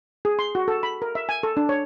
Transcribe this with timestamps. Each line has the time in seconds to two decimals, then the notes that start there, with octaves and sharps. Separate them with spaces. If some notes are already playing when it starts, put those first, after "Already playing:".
0.25 G#4
0.39 C6
0.55 F#4
0.68 A4
0.83 B5
1.02 A#4
1.15 E5
1.29 G#5
1.43 A4
1.57 D4
1.69 C#5